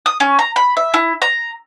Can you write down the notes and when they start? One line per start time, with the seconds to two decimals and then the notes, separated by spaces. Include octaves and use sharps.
0.06 D#6
0.20 C#4
0.39 A#5
0.56 B5
0.77 E5
0.94 E4
1.22 A#5